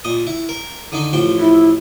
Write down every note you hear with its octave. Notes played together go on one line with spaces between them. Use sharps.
A#2 D#5 D#6
E4
A#4
D3 D#3 D#4
A1 F3 G5
E4